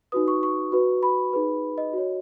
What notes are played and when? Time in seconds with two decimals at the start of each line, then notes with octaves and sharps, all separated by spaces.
0.12 D#4 F#4 B4 D#6
0.28 C#6
0.43 C#6
0.72 F#4 B4
1.03 B5
1.33 D#4 G#4 B4
1.78 D#5
1.93 F#4 C#5